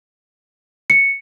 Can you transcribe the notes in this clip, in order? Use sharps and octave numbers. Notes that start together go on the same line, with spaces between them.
C#7